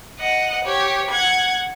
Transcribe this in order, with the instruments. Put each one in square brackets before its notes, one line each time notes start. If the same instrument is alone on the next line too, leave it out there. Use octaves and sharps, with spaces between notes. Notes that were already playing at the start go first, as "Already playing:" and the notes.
[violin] D#5 F#5
G4 C#5
F#5 G#6